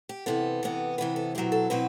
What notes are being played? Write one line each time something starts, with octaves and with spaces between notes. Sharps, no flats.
G4
C3 E3 B3 A4
C3 E3 B3
C3 E3 B3 B4
A4
B2 F#3 C4 E4 G4
A4
B2 F#3 C4 E4 B4